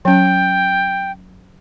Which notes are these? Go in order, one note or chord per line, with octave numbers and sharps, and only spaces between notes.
F#3 C#4 G5